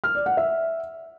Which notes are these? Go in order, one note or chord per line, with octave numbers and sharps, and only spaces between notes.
F6
D5
F#5
E5